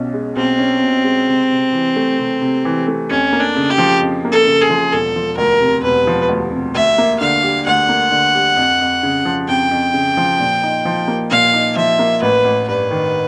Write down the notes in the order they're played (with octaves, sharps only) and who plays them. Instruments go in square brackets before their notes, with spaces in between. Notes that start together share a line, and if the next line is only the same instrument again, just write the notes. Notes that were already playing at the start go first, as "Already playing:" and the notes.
Already playing: [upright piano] B1 B2 C#4
G#3
[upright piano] B1 [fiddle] C4
[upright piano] C#4
B2
G#3
C3
C3
E3
A3
C3
C3
E3
A3
[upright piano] F2 [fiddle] C#4
[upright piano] A#3
[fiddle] D4
[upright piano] C#3
[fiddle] G4
[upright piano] F3
F2
A#3
[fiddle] A4
[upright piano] C#3
[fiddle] G#4
[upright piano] F3
[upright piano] E1 [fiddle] A4
[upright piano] F3
[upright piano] D2 [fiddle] A#4
[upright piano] C3
[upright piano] E1 [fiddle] B4
[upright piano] F3
D2
C3
[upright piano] D2 [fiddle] E5
[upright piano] A#3
[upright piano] D3 [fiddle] F5
[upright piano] G3
[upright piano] D2 [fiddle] F#5
[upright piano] A#3
D3
G3
F2
F2
C#3
F3
[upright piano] F2 [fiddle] G5
[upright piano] F2
C#3
F3
A#2
D#4
F3
A#3
[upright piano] A#2 [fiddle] F5
[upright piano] D#4
[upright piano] F3 [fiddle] E5
[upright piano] A#3
[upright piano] A1 [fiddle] B4
[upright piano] A1
[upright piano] G2 [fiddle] B4
[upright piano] D#3